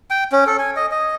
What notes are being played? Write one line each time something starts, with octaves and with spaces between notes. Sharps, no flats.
G5
C#4
A4
G#5
D#5
D#5